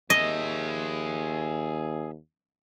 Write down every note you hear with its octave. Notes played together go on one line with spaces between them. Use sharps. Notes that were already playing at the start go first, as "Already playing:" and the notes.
D#2 G#4 D#5 E5